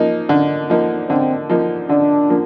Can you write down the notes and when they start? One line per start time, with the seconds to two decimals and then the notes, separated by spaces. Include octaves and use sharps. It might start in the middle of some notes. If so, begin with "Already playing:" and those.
Already playing: F3 A#3 D#4
0.29 D3
0.70 F3 A#3 D#4
1.09 D3 C4
1.49 F3 A#3 D#4
1.89 D3 D4
2.29 F3 A#3